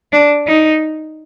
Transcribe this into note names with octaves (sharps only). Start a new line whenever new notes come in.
D4
D#4